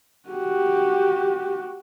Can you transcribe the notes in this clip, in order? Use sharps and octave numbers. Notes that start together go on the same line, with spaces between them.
F#4 G4